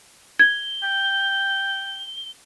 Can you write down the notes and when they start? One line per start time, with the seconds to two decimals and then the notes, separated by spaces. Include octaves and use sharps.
0.39 G#6 G7
0.83 G5